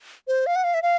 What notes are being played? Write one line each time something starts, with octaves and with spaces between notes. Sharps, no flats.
C5
F5
F#5
F5
E5
F5